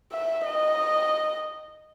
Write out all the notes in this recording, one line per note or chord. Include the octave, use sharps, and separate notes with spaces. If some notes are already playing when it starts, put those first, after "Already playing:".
E5
D#5